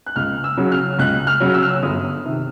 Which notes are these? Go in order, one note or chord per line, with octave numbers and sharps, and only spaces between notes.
F#6
C#2 F6
E6
C#3 F#3
F6
C#2 F#6
F6
C#3 F#3
E6
F6
E6
G1 D#6
C3 D#3